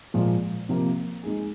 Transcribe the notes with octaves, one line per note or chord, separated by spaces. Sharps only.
A#2 F3 G#3
C3 F3 A#3
G#3 D#4 G#4